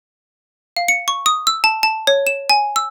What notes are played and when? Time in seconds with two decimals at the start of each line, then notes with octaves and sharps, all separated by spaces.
0.77 F5
0.88 C#7
1.08 C#6
1.26 D#6
1.47 E6
1.64 A5
1.83 A5
2.07 C#5
2.27 E7
2.50 G#5
2.76 E6